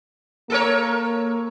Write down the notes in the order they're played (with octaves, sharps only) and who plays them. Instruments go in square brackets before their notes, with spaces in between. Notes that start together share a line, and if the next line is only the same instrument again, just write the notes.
[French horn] A#3 [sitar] A4 A#4 C#5